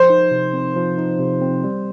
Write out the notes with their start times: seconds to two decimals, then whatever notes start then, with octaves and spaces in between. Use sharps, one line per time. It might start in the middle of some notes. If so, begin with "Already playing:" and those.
Already playing: F3 C5
0.10 D#4
0.31 C3
0.53 C4
0.76 F3
0.98 D#4
1.19 C3
1.42 C4
1.64 G3